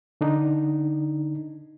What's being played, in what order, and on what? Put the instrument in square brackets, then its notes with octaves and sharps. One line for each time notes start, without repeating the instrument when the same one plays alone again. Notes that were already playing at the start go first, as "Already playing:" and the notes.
[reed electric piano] D3 D4 D#4